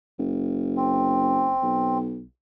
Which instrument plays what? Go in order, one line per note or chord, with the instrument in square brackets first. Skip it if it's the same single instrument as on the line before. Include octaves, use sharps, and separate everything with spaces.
[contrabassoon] F#1
[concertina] C4
[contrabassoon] B1